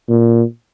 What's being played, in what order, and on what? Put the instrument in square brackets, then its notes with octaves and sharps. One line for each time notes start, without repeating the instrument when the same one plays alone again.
[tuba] A#2